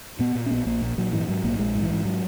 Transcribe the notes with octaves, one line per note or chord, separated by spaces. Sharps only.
A#2 B3
A#2
C#4
A#1 B3
A#1 A#3
A#2
A#2 F#3
G#2 E3
G#2 F#3
A#1 A#3
A#1 G#3
G#2
E3
G#2
F#3